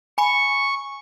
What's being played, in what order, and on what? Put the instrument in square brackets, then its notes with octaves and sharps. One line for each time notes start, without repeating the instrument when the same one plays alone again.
[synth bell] G#5 B5 C#7 [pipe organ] C#6